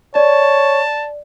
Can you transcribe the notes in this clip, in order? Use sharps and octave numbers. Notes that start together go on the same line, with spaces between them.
C#5 D5 A5